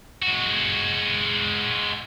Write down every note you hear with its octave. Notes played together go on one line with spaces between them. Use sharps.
G#3 F#4